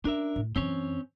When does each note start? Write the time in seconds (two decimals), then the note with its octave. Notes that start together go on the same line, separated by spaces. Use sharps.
0.05 C#4 D4 A#4 E5
0.36 A2
0.56 F#2 E3 C4 C#4 C#5